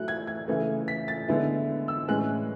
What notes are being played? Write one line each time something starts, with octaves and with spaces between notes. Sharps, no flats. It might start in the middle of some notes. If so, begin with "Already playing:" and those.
Already playing: F#3 A3 E4 F#6
G#6
G#6
C#3 E3 A3
B6
A6
D3 G#3 B3 E4
E6
A2 E3 G#3 C#4 F#6